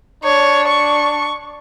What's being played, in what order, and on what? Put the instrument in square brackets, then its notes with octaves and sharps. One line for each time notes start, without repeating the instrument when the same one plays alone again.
[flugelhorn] D4 [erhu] C#5
[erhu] C#6